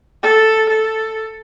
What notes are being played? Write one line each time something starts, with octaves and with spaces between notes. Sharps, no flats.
A4
A4